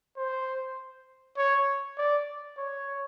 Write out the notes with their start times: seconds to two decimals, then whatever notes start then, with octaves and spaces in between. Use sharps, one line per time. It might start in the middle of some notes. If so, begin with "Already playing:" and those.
0.17 C5
1.37 C#5
1.98 D5
2.58 C#5